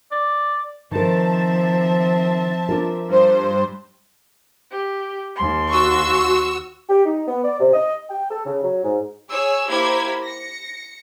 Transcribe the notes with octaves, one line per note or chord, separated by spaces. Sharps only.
D5
D#3 F3 C4 A#4 E5 A5
D4 F4 A#4
G2 C5
G4
D#2 C6
F#4 C#6 E6
G4
D#4
B3
D5
C3
D#5
G5
A4
C#3
F#3
G#2
G#4 C#5 E6
A#3 E4 G4 C5 G#6 B6
A#6 C#7